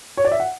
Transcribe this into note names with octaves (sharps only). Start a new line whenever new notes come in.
C#5
D5
E5
F#5